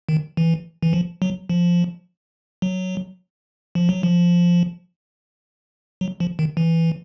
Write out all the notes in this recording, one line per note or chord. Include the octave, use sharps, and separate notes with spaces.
D#3
E3
E3
F3
F#3
F3
F#3
F3
F#3
F3
F#3
F3
D#3
E3